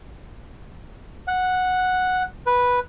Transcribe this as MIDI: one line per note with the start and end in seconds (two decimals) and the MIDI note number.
1.28 2.23 78
2.47 2.80 71